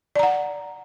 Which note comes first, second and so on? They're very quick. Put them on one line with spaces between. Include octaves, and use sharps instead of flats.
D5 A#5 F#5